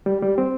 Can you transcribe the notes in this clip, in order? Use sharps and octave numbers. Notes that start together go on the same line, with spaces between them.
G3
G3
C4